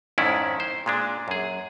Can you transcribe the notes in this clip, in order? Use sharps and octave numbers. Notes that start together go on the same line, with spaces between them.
F2 G#2 D#3 C#4 E4 D5
C5
A#2 G#3 D4
F#2 G#4